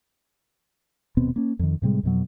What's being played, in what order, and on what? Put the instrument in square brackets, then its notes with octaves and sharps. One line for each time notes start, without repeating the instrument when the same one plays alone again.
[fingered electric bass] D#1 B2 B3 C4
A#3 C#4
F2 D#3
A2 C3 G3 G#3
F2 B2 F#3